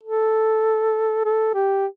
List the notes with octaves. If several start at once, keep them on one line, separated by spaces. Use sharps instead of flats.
A4
A4
G4